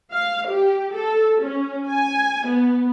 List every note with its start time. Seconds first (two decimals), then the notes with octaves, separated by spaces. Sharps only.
0.12 F5
0.49 G4
0.93 A4
1.42 C#4
1.87 G#5
2.46 B3